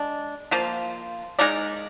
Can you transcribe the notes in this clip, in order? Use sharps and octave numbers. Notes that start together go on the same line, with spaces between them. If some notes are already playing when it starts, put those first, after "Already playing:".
Already playing: G#3 D4
F3 A#3 F4
G#3 D#4 A#4 D5